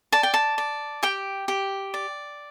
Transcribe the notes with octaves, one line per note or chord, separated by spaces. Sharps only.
D5 A5
G5
A5
D5
G4 G5
G4
D5